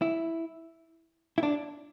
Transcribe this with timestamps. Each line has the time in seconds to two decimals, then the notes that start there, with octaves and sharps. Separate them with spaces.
0.02 E4
1.38 E4
1.43 D4